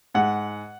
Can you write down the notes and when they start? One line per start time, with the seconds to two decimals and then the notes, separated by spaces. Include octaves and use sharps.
0.14 G#2 F#5